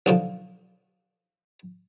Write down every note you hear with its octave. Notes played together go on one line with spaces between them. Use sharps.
B1 D3 F3